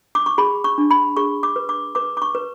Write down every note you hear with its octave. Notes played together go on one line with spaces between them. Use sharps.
D6
C#6
G#4 B5
C#6
D4
B5
G#4 C#6
D6
B4
D6
B4 D6
D6
C#6
B4